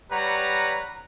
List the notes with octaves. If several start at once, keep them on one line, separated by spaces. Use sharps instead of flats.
G3 B4 C#5 F#5 A#5